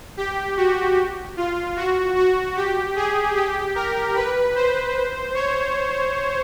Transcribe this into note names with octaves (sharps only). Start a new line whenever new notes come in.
G4
F#4
F4
F#4
F#4
G4
G#4
G4
A#4
B4
C5
C#5